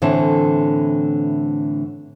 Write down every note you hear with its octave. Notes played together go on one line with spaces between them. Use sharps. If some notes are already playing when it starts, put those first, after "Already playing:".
A2 D3 E3 C4 E4